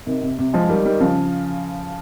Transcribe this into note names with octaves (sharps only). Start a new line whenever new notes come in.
C3 D#3
C3
C3
F3 G#3
D#3 G3
D#3 G3
C#3 F3